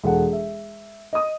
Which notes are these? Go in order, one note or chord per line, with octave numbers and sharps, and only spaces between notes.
E1 A4 F#5
E5
D#5 D#6